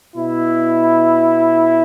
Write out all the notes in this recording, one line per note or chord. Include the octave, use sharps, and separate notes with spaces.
B2 E4